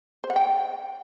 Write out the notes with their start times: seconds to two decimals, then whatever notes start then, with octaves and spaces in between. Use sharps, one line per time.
0.24 C5
0.30 F#5
0.36 G5